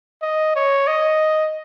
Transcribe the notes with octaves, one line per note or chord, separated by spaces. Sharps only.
D#5
C#5
D#5